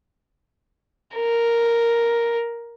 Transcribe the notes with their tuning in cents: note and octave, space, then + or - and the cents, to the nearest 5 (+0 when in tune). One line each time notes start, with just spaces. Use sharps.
A#4 +0